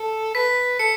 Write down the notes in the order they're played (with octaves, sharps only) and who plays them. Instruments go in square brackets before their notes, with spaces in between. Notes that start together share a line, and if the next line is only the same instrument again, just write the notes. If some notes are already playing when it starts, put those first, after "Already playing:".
Already playing: [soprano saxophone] A4
[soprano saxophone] B4 [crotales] B6
[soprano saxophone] A4 [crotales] C#7